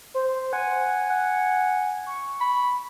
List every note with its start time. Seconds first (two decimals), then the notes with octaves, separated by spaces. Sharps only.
0.14 C5
0.53 F#5 G#5
1.10 F#5
2.07 C#6
2.41 B5